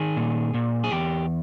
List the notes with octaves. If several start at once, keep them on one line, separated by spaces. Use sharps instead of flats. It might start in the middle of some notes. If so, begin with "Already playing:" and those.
Already playing: D#3 G#4
A#2
A#2
G#4
E2 G4